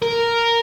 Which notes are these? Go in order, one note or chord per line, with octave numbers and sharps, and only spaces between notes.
A#4